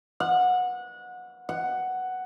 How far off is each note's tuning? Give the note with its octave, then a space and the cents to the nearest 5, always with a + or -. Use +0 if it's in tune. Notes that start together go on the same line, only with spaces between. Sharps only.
F#5 -25
F#5 +5